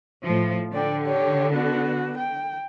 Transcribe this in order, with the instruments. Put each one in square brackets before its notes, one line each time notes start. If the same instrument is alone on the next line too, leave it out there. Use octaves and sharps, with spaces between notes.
[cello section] A2 F3
[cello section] D3 [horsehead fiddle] D5 G5
[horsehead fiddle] G4 C#5
B3 F#4
G5